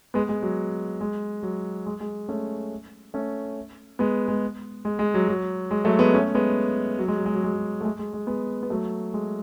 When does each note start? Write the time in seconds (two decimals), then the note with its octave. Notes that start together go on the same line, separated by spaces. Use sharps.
0.14 G#3 B3
0.29 G#3
0.42 F#3
1.01 G#3
1.43 F#3
1.86 G#3
2.00 G#3
2.28 A3 C#4
3.14 A3 C#4
3.99 G#3 B3
4.28 G#3
4.85 G#3
4.99 G#3
5.14 F#3
5.28 F#3
5.71 G#3
5.85 F#3 A3
5.99 G#3 B3
6.14 A3 C#4
6.35 G#3 B3
6.99 F#3
7.08 G#3
7.17 F#3
7.26 G#3
7.35 F#3
7.44 G#3
7.53 F#3
7.81 A3
7.85 G#3
7.99 G#3
8.13 G#3
8.27 G#3 B3
8.63 B3
8.70 F#3 A3
9.14 G#3